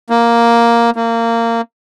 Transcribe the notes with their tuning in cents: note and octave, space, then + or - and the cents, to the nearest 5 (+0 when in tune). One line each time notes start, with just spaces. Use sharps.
A#3 +5
A#3 -20